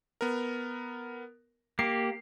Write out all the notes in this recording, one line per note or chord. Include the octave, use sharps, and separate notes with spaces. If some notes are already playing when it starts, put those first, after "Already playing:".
B3 A#4
A#3 G4 C7